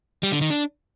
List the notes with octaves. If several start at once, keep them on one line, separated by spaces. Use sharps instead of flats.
G3
D3
D#3
D4